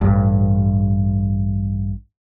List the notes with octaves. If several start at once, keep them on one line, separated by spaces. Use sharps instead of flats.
A1 G2